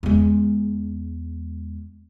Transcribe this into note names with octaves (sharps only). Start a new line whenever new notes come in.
E2 G#3